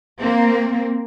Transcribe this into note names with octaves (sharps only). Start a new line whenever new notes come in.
A#3 C4